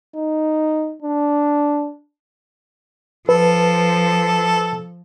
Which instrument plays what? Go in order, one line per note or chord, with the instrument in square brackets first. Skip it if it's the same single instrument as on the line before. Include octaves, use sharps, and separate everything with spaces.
[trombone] D#4
D4
[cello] F3 [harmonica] A4 [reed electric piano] B4